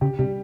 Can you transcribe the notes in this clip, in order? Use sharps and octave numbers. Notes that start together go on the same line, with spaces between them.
C#3 G4
C3 G3